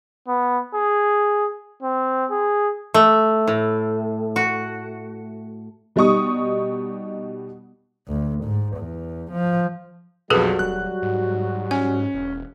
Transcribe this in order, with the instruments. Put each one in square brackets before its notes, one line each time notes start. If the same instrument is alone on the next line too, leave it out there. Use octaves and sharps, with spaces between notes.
[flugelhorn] B3
G#4
C4
G#4
[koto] A3
A2
F#4
[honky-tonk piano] B2 G3 D#4 C#6 D#6
[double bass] D2
G#2
E2
F3
[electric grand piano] B1 F2 [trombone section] F#3 G3 F#4 [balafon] G#4 A4 B4
[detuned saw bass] D#1 [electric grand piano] F#6
[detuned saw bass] G#2
[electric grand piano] C#4 [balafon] G#5
[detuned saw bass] E1